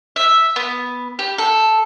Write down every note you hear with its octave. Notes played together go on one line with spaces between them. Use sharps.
E5
B3
G4
A4